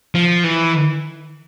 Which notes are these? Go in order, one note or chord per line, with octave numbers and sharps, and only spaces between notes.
F3
E3